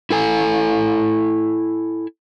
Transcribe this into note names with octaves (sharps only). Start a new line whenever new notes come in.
E4 A4 G#5